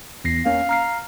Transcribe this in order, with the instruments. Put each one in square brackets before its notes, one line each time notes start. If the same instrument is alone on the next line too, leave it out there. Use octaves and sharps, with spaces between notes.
[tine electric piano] E2 A#6 C7
[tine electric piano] A#3 C#4 [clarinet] F5
[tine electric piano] A#5 F6 C7